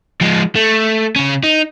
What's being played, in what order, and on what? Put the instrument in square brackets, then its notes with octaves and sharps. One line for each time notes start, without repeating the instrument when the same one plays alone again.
[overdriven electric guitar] F3 G#3
A3
C#3 C#4
D#4